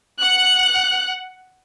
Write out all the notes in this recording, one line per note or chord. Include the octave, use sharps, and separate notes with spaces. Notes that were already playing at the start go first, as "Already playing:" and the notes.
F#5 F#6